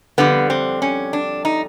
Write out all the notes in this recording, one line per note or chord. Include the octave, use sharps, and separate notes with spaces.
F2 D3 G3 B3
C4
C#4
D4
D#4